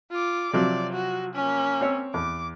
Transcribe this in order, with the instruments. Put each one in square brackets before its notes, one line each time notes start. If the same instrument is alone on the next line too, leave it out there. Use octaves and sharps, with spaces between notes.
[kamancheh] F4 D6
[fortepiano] C3 F3 F#3 [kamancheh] D5
[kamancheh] F#4
A#3 C#4
[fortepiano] C4 C#5 E6
[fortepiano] E2 [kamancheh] D6